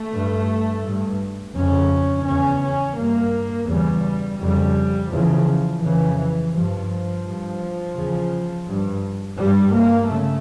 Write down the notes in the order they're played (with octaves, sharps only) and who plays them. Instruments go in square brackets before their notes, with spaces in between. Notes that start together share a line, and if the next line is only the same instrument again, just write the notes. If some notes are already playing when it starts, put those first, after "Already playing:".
Already playing: [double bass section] A3
G2
G2
F2 C#3 C#4
E2 C#3 C#4
C#4
G2 A#3
E2 C#3 G3
F2 C#3 G3
E2 C#3 F3
F2 C#3 E3
E3
G2 F3
G2
E2 C#3
G2
G2 G3
A#3
C#3 A3